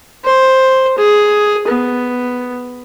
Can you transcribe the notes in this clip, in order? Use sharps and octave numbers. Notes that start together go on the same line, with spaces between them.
C5
G#4
B3